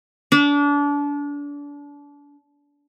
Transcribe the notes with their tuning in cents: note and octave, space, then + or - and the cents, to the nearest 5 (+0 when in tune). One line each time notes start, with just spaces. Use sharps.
D4 -30